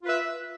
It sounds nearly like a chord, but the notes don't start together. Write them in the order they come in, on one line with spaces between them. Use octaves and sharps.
F4 B4 E5